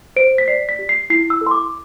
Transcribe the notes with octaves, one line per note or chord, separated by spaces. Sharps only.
C5 D7
B6
D5 C7
B6
G4
C7
E4 C7
E6
A4
C6
D6